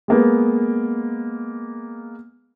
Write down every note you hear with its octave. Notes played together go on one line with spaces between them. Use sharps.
G#3 A#3 B3